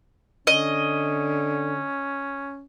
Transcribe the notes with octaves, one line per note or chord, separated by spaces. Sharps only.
D3 C#4 D#5